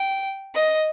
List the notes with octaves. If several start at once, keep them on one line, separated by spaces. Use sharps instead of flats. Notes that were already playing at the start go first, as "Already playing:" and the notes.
Already playing: G5
D#5